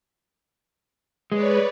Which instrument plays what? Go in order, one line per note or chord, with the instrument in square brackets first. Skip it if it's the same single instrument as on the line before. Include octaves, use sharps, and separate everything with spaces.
[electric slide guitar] G#3 [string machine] B4 C#5 D5